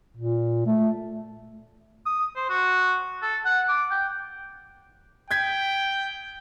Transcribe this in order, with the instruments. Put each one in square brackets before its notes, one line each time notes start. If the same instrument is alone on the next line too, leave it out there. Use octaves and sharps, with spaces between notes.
[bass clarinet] A#2
A3
[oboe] D#6
C5
F#4
A4
F#5
D6
G5
[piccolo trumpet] G5 [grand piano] G6 G#6 B6